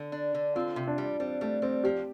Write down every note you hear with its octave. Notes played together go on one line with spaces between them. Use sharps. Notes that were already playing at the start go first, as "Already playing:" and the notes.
Already playing: D3
D4
D3
C4 F4
C3
D4
G3
G3 C4
G3 A3
G3 C4
F3 G4